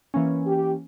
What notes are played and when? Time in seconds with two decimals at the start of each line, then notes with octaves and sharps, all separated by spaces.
0.14 E3 A#3 C#4
0.46 G4